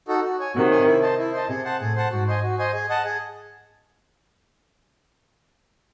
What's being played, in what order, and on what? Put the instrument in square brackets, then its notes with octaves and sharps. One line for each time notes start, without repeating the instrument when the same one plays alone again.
[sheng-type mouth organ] D#4 F#4 A4
F#4
C#5 G#5
[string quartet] C3 D#3 [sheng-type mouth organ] F#4
[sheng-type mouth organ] C#5 G#5
E4
C5 D#5 A5
E4
C5 D#5 A5
[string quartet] C3 [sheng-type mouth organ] G#4
[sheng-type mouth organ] C5 F#5 A5
[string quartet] A2 [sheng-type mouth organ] G#4
[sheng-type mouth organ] C5 F#5 A5
[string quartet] G#2 [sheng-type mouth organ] F#4
[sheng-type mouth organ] C5 D#5 G#5
F#4
C5 D#5 G#5
G#4
D#5 F#5 A5
G#4